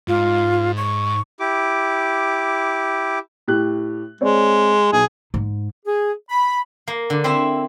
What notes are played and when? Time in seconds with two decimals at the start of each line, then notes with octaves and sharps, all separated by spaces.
0.08 G#2 F4
0.77 C#6
1.40 E4 G4 D6
3.48 A2 G4 F#6
4.21 G#3 C4 C#5 D5
4.93 B1 G#4
5.34 G#2
5.86 G#4
6.29 B5
6.88 A#3
7.10 D3
7.24 C4 E4 E5